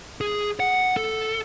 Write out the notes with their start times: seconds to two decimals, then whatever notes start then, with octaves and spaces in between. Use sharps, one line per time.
0.21 G#4
0.60 F#5
0.97 A4